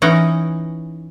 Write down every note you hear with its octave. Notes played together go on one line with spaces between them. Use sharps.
E3 C#4 D#4 F#5